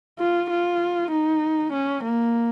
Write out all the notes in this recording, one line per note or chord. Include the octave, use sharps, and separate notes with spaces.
F4
F4
D#4
C#4
A#3